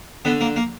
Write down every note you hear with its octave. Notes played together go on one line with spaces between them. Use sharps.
D3 B3
A#3
A#3